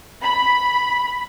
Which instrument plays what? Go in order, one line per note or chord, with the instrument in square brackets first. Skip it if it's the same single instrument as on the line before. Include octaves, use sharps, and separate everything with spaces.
[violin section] B5